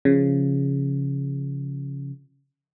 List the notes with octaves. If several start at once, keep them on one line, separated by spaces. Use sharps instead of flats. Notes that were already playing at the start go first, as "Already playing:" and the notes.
C#3 F3